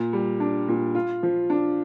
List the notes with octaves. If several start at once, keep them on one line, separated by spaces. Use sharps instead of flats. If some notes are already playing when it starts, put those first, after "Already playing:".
Already playing: A#2
G3
D4
A#2
F4
F3
D4